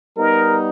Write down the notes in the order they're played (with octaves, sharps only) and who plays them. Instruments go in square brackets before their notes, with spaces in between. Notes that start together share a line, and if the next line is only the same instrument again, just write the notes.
[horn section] G3 B3 D#4 [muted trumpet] A#4